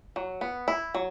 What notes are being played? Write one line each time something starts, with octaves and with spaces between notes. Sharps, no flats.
F#3
B3
E4
F#3